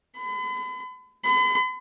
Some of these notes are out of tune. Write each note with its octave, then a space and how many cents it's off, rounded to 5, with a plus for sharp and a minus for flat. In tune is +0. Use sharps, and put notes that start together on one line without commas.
B5 +40
B5 +45